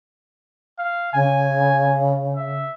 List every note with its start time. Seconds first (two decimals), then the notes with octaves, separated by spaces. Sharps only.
0.78 F5
1.13 C#3 G#5
2.35 E5